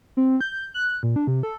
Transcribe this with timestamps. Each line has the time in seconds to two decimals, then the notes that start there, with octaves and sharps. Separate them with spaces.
0.17 C4
0.41 G6
0.74 F#6
1.03 A#2
1.16 D4
1.27 C3
1.43 A4